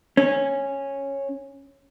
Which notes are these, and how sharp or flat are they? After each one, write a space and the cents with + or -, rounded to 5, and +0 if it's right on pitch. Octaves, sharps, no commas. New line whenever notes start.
C#4 -10